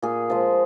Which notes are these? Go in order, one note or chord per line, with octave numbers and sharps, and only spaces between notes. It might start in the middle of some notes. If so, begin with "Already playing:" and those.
A#2 G#4
F3 G#3